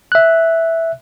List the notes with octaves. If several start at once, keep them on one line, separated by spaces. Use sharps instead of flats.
E5 F#6